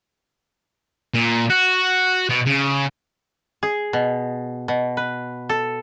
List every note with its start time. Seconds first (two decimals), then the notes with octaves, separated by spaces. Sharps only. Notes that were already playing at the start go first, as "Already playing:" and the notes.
1.14 A#2
1.50 F#4
2.30 B2
2.46 C#3
3.63 G#4
3.93 B2
4.68 B2
4.97 B4
5.49 A4